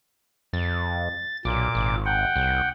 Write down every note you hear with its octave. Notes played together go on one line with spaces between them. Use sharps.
F2 A6
B1 A#2 D6
G#1
F#5 G5
C2